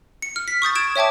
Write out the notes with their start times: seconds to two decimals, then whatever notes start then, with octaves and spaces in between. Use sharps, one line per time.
0.22 C#7
0.36 F6
0.48 B6
0.62 C#6 D#6 G6 A6
0.75 G#6 D7 E7
0.96 C#5 E5 G5 A5 D6